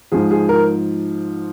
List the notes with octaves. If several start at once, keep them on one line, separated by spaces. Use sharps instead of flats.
G#2 F3 G#4
G#4
A#4